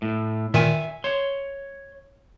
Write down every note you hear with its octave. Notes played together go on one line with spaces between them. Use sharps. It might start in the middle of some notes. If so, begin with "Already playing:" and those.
A2
A#2 D#3 E5 G#5
C#5 C6